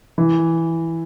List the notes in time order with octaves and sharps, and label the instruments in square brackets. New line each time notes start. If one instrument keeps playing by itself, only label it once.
[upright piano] E3